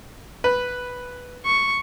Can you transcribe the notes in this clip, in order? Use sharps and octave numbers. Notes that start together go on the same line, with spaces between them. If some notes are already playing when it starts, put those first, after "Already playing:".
B4
C#6